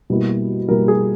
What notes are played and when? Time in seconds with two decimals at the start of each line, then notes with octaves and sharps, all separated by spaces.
0.10 B2 G3 A#3 E4
0.68 B2 G3 A#3 E4 A#4
0.88 G#4